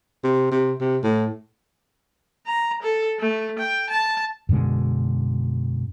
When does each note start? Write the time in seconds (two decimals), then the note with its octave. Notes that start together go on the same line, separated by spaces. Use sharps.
0.24 C3
0.51 C3
0.81 C3
1.03 A2
2.46 A#5
2.83 A4
3.19 A3
3.59 G5
3.90 A5
4.49 F#2 B2 D3 G#3